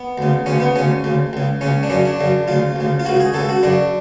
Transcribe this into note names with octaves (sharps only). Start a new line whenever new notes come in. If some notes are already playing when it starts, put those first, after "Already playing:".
Already playing: B3
D2 C#3
D2 C#3 C#4
B3
D2 C#3 C#4
D2 C#3
C#2 C#3
C#2 C#3 C#4
D4
F#2 C#3 C#4
D4
F#2 C#3
D2 C#3 F4
D2 C#3
F4
C#2 C#3 F#4
G#4
C#2 C#3 A4
F#4
F#2 C#3 D4